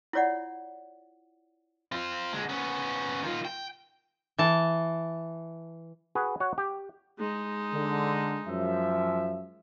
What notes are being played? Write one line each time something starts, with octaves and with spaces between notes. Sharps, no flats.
E4 F4 C#5 D5 F#5
C4 F4
D3 G#3
B3 C#4
D#3 F4
G5
E3 A5
F#4 G#4 B4
F#4 C#5 F#5
G4
G#3 D#4
D3
F#2 F3 E5